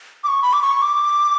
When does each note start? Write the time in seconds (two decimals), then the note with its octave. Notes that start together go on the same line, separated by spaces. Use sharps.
0.24 D6
0.28 C#6
0.42 B5
0.53 D6
0.62 C#6
0.82 D6